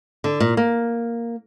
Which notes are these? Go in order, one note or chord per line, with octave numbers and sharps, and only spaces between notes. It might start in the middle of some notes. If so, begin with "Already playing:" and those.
D3
A#2
A#3